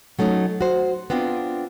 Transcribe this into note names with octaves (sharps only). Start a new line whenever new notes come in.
F#3 A3 C#4 D#4
F#4 C5
B3 C4 D4 F4